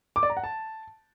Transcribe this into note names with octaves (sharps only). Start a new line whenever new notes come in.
D6
D5
A#5
F#5
A5